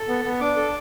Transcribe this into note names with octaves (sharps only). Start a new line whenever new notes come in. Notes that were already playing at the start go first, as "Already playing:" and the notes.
Already playing: A4
B3
B3
D4 D6
A4